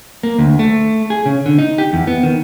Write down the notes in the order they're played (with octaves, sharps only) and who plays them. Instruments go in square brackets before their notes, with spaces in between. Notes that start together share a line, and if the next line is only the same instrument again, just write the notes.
[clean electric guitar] A#3
D2
A3
G#4
C#3
D3
D#4
G4
E2
B3
D#3